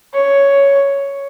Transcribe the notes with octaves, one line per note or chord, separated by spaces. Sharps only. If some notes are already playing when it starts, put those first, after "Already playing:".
C#5